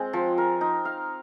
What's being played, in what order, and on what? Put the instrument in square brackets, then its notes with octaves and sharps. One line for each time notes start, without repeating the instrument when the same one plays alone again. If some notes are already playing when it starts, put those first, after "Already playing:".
Already playing: [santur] G#3 C4
F3
A#4
D#4
F5